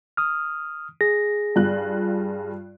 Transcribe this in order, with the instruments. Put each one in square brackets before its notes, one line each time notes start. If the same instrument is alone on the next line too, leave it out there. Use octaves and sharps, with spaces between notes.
[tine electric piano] D#6 F6
G#4 A#6
[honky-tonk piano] G2 F4 F#6